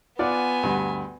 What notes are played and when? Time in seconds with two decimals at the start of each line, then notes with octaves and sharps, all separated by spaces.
0.19 B3 F4 D5 F#5 G#5
0.63 D2 G2